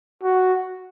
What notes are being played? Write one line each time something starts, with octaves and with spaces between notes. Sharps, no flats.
F#4